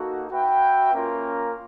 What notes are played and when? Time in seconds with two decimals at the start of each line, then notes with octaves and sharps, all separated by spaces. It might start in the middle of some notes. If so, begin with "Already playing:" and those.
Already playing: A#3 D#4 F#4 A4
0.30 F#4 B4 E5 G5
0.93 A#3 C#4 F4 A#4